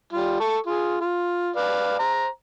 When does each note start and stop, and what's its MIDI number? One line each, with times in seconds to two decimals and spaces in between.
0.13 0.39 55
0.13 0.39 65
0.40 0.57 69
0.40 0.57 85
0.66 0.97 65
0.66 0.97 68
1.01 1.51 65
1.56 1.97 71
1.56 1.97 74
1.56 1.97 77
1.99 2.28 72
1.99 2.28 82